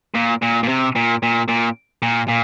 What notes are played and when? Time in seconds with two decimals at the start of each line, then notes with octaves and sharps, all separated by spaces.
0.15 A#2
0.42 A#2
0.63 A#2
0.68 C3
0.96 A#2
1.23 A#2
1.48 A#2
2.02 A#2
2.29 A#2